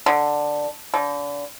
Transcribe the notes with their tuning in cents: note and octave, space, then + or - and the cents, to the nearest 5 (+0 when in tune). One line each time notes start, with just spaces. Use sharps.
D3 +5
D3 -35